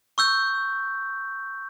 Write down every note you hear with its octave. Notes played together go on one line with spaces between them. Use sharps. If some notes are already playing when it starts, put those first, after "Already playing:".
C#6 E6 G6